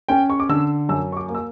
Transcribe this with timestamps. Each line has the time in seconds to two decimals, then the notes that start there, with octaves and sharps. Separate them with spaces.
0.09 C#4 G5
0.30 C#6
0.40 D6
0.49 D3 E6
0.89 F#2 E6
1.12 C#6
1.17 D6
1.29 A#3
1.35 E6